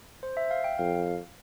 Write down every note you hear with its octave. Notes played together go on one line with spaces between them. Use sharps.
C5
E5
F5
G5
F2 F5